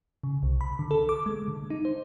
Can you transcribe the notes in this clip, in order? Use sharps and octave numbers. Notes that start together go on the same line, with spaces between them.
C#3
C2
B5
D3
A4
D6
G#3
D3
D#4
C5